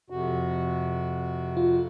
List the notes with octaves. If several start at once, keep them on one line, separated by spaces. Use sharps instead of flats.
F2 C3 F#4
F4